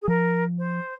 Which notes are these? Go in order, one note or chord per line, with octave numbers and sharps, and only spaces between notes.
G#4
F3 A#4
C5